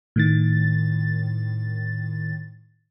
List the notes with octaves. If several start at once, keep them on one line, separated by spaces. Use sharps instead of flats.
A2 D#3 A6